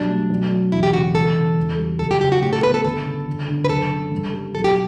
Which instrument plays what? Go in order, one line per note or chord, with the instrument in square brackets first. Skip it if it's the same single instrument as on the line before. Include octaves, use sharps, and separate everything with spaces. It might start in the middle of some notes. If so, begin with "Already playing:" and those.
Already playing: [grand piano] B1 G3 [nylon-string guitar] D4
[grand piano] A3
B1
F#3
[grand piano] E1 [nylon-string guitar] E4
[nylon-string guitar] G4
[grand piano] C#3 [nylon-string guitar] F#4
[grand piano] E1 [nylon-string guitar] A4
[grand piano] C#3
E2
G3
[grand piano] F#1 [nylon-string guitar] A4
[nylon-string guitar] G4
[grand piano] C#3 [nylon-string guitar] G4
[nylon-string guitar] F#4
[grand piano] A2 [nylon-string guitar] G4
[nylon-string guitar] A4
[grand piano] B3 [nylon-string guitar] B4
[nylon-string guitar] A4
[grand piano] G1 [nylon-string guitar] A4
[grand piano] C#3
G1
D3
[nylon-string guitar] B4
[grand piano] F#1 [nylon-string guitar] A4
[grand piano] C#3
G2
G3
[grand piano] B1 [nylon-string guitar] A4
[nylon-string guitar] G4